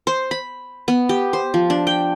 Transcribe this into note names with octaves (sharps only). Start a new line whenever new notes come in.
C5
B5
B3
G4
C5
F3
D4
G5